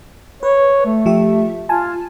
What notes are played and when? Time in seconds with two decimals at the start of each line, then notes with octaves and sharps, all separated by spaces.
0.43 B4 C#5
0.86 A3
1.06 F3 G4 E5
1.69 F4 G#5 A5